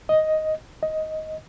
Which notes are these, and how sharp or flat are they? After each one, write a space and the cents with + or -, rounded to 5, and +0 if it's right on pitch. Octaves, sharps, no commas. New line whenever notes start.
D#5 +5
D#5 +10